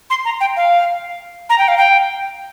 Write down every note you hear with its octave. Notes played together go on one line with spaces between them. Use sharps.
C6
A#5
G5
F5
A#5
G5
F5
G5